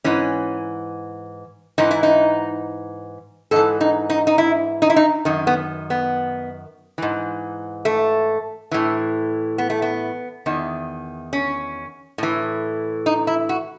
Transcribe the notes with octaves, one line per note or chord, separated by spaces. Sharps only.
G#2 E3 C#4
G#2 E3 D#4
E4
D#4
G#2 E3 A4
D#4
D#4
D#4
E4
D#4
E4
D#4
F#2 D#3
B3
B3
G#2 E3
A3
A2 E3
B3
A3
B3
E2 D#3
C#4
A2 E3
D#4
E4
F#4